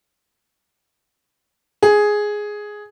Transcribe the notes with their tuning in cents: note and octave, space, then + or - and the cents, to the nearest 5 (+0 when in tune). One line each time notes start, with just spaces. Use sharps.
G#4 +5